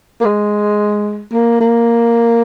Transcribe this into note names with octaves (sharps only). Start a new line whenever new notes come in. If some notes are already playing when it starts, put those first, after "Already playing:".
A#3
G#3
A#3
A#3